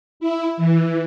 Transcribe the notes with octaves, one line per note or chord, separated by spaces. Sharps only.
E4
E3